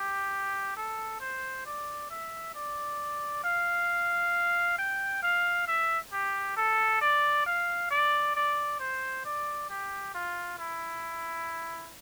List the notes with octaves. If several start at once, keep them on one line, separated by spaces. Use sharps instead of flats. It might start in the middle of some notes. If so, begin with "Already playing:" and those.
Already playing: G4
A4
C5
D5
E5
D5
F5
G5
F5
E5
G4
A4
D5
F5
D5
D5
C5
D5
G4
F4
E4